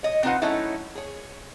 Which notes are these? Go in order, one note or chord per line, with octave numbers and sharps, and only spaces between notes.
C#5 D#5
C4 D4 D#4 F4 B4 F#5
F#3 A3 C#4 D#4 E4
G#4 C#5